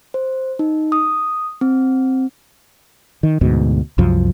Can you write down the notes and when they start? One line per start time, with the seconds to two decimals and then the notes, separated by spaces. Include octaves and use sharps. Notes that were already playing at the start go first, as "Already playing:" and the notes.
0.14 C5
0.59 D#4
0.92 D#6
1.61 C4
3.23 D#3
3.41 D2 G#2 B2
3.98 C2 F#2 F3